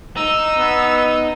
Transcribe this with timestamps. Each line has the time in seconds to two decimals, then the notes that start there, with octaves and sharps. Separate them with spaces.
0.17 D#4 E6
0.58 B3